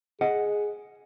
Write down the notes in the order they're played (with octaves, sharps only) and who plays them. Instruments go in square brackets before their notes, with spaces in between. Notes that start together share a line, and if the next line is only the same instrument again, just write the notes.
[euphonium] G#4 [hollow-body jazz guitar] D#5 F#5